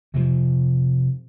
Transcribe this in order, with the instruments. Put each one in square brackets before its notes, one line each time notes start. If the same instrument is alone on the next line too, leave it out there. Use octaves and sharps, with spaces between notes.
[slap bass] C3 F3